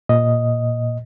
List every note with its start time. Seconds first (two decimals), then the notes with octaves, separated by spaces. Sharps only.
0.09 A#2 D#5